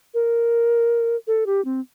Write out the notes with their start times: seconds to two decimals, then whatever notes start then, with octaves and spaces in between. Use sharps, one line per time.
0.14 A#4
1.27 A4
1.46 G4
1.65 C4